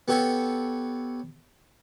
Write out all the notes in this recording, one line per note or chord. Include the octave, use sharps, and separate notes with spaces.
B3 G4 A4 C#5